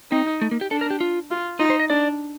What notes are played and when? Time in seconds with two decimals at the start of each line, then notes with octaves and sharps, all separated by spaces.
0.12 C4 D#4
0.42 A3
0.51 A#3
0.61 G4
0.71 D4 A4
0.81 A#4
0.91 G4
1.01 F4
1.31 F4
1.59 D#4 F4
1.70 C5
1.79 D#5
1.89 D4 D5